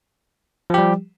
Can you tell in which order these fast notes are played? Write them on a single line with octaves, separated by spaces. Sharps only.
F3 G4 G3